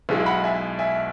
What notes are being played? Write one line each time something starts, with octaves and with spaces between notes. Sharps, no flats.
B1 B2 G#3 E4
F#5 B5
E5 G#5
E5 G#5